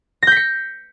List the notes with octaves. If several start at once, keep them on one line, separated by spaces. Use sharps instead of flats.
G6 A#6 B6 C#7